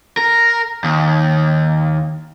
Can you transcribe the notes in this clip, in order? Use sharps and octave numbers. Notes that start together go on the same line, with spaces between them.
A#4
D#2